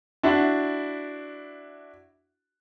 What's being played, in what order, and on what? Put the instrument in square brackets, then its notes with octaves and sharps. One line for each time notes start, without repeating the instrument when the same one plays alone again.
[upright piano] D4 E4 F#4